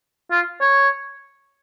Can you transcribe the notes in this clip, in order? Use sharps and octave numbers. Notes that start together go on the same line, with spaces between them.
F4
C#5